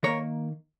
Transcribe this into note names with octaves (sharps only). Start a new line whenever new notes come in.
D#3 A#3 A#4 C#5